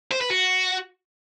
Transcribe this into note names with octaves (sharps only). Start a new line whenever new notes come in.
C5
B4
F#4